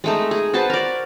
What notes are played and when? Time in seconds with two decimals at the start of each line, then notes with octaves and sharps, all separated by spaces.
0.04 G#3 A3 D#4
0.31 G#4
0.53 F#4 B4 C5 A5
0.70 A#4 D5